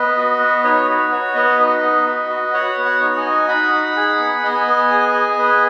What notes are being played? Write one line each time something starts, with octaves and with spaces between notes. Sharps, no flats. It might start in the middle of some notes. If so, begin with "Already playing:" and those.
Already playing: B3 B4 D#5
F#4
B3
D#4 C#5
F#4 B4
F#4 C#5
B3 B4 D#5
D#4
B3
F#4
F#4
F#4 C#5 F#5
B3
C#5 F#5
D#4
D#5 G#5
F#4
D#4 F#5 B5
D#4
G#4
B3
B3 D#5 G#5
B3
G#4
G#4
B3 B4 D#5